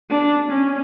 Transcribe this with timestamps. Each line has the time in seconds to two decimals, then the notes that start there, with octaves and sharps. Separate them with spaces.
0.11 D4
0.51 C#4